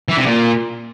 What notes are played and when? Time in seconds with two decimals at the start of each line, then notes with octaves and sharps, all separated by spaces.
0.09 E3
0.18 C3
0.26 A#2